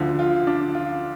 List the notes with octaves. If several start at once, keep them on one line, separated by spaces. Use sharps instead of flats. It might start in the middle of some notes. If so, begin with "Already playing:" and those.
Already playing: D2 D3 F3
F4
D4
F4